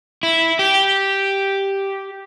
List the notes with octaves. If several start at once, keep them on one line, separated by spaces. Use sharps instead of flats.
E4
G4